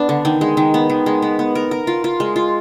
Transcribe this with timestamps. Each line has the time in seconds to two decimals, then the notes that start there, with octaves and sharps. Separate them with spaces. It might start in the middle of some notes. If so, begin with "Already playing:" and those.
Already playing: B3 D4
0.09 D3
0.25 D#3
0.41 G#3
0.57 D#3
0.74 B3
0.90 D#3
1.06 G#3
1.22 B3
1.39 B3
1.55 A#4
1.71 A#4
1.87 F4
2.04 F4
2.20 G#3
2.36 F4